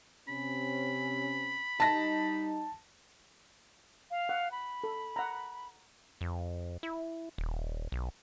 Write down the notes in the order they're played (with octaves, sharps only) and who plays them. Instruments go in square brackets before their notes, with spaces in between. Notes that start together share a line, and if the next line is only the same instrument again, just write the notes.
[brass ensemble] C3 C4 C#4 [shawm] B5
[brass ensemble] G3 D#4 [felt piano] A5 A#6
[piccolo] F5
[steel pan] F#5
[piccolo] B5
[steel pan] A4
F#5 A#5
[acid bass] F2
E4
D#1
B1